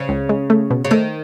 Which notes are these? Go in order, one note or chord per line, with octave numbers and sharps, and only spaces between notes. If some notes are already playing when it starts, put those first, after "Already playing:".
Already playing: C#3
C#2
G#3
A3
B2
C#3
D#3 A3